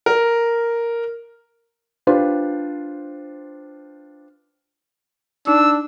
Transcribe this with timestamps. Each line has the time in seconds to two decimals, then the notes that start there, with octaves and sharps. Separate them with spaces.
0.06 A#4
2.07 D4 F4 G4 B4 C5
5.47 D4 D#4 E6